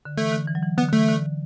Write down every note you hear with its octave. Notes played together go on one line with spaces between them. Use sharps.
D3
E3 A3
D3
E3
F#3
E3
D3 B3
D3
A3
E3
D3